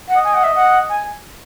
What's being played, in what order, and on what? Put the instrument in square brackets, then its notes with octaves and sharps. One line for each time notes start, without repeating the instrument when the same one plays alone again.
[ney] F#5
[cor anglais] D#5
[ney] G#5
F#5
E5
F#5
G#5